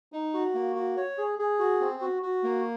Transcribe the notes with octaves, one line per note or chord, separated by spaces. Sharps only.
D#4
F#4
A#3
F#4
C#5
G#4
G#4
F#4
C4
F#4
F#4
A#3